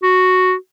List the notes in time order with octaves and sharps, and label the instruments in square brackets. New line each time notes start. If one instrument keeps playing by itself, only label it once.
[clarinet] F#4